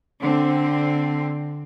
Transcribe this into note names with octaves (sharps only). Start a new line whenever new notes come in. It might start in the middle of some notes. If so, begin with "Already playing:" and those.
D3 C4